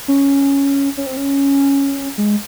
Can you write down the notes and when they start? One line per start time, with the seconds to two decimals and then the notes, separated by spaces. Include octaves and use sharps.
0.08 C#4
0.97 C#4
1.06 C4
1.17 C#4
2.18 G#3